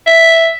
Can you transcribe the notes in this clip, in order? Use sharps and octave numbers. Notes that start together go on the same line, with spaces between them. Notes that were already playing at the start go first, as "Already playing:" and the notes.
E5